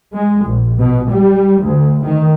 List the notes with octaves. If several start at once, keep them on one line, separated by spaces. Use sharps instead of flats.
G#3
A#1
B2
G3
D2
D#3